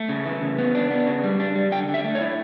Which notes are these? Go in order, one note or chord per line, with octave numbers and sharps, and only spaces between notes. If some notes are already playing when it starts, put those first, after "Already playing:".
Already playing: A3
C#3
E3
C#3
B3
D4
B3
C#3
G3
D4
G3
D3 G5
D3
E5
A3
C#5
E4